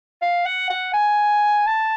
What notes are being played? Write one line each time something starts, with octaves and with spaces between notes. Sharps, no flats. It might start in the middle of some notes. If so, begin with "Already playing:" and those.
F5
F#5
F#5
G#5
A5